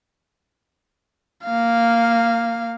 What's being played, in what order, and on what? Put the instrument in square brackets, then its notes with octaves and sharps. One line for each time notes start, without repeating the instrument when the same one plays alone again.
[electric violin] A#3 F5